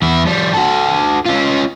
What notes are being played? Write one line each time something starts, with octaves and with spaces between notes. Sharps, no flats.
E2 E4
F3 G3
F#4 A4
C#4 F4